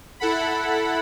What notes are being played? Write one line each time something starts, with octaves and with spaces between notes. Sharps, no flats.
E4 A4 F#5 B5